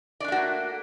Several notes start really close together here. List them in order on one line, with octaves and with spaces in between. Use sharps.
D5 D4 A3 F#4 A#3